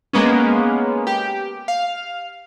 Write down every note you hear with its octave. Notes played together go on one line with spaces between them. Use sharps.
G#3 A#3 B3 C#4
G4
F5